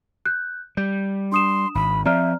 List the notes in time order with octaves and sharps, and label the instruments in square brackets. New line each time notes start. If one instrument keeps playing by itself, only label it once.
[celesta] F#6 G6
[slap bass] G3 [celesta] G6
[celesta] D4 D#6 E7 [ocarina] C6
[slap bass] G#1 [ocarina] B5
[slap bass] F3 C4 [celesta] D5 A#5 F6 [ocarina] E5